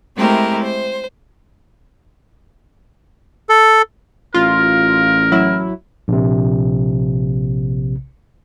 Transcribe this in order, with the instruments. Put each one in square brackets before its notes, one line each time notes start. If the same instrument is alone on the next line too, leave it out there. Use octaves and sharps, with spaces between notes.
[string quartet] G#3 A3 C4 E4 G4 A#4
C5
[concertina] A4
[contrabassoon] A1 [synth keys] F4 [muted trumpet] A#4
[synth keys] F#3 E4
[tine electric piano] A#1 C3